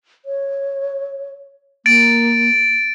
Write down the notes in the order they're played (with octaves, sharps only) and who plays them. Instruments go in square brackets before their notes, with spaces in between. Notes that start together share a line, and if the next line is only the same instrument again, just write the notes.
[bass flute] C#5
[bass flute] A#3 [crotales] A6 D7